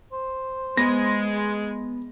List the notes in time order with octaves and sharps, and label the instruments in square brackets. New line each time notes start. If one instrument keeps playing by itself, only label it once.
[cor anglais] C5
[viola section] G#3 [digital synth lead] B3 [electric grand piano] A#6